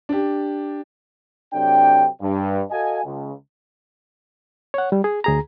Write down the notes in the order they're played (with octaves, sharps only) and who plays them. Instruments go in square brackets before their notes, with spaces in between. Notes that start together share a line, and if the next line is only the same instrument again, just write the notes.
[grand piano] D4 G4
[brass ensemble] C3 F#3 D4 A4 G5
G2
F#4 A4 D#5 F5 G#5
C#2
[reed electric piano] C#5 F#5
G3
G#4
D2 G#4 A#5